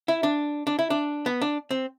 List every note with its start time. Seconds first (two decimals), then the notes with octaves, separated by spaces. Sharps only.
0.08 E4
0.23 D4
0.67 D4
0.79 E4
0.90 D4
1.26 B3
1.42 D4
1.71 C4